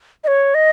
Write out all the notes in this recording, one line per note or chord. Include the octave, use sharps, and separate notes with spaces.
D#5
C#5
D#5